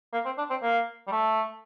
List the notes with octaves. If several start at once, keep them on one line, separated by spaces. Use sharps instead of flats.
A#3
C4
D4
C4
A#3
G3
A3